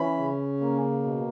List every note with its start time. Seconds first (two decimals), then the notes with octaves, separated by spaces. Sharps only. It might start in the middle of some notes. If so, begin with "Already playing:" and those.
Already playing: E3 C#4 B5
0.18 C#3
0.61 A#3
1.03 B2